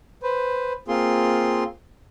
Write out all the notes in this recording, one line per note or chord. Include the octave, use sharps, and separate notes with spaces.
B4 C5
A#3 C4 F4 G#4 C6